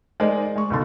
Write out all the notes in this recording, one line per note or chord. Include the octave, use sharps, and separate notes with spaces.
G#3 D#4 A#4 C5 D5 D#5
G#3 C#6
C#2 B2 D#3 F4 A4 C6